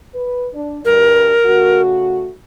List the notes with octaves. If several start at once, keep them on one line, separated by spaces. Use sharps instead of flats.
B4
D4
D2 G2 A#4
C#3 A3 F#4